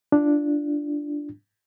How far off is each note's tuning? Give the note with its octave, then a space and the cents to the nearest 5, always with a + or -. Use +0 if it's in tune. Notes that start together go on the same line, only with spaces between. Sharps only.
D4 +0 F4 -30